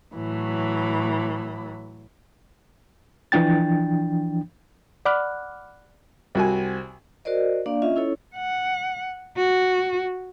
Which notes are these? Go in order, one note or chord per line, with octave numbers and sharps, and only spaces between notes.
A2 E3 F#3 B5
E3 F3 D4 G5 A6
D5 F#5 B5 D6 F6 F#6
C2 F#4 G#5
F#4 A#4 C5 D5 D#5
A#3 D4 D5 F5
C#4 F4 D#5 E5
C#4 E4 A4 C#5
F#5
F#4